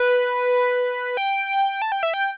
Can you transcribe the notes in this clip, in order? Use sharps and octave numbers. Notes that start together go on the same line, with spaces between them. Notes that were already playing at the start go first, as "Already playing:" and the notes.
Already playing: B4
G5
A5
G5
E5
G5